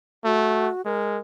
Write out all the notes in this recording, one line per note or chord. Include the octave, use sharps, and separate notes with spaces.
A3 F#4
G#3 A#4